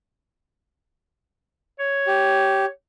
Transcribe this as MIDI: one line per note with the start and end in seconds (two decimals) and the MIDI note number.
1.79 2.68 73
2.07 2.65 67